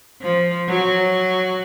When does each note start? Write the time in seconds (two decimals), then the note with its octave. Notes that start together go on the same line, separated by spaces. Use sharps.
0.21 F3
0.68 F#3